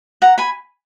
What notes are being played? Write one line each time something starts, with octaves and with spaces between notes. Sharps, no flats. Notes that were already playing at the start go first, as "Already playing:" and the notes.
F#5 A#5
G#5 B5